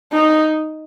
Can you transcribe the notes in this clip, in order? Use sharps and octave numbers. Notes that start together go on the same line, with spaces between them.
D#4